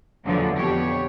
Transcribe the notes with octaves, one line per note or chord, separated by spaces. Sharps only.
E2 A#2 D3 F3 F#3
F2 B2 G4 C#5